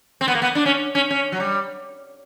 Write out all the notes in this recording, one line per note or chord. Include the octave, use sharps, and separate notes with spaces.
C4
B3
A#3
B3
D4
C#4
C#4
C#4
F#3
G3